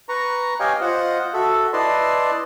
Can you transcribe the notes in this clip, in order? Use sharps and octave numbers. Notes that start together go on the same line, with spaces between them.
B4 A#5 C#6
G4 C#5 D#5 F5 G5 G#5
F4 C5 D#5 F#5
F#4 A4 E5
E4 B4 D5 D#5 A5 C6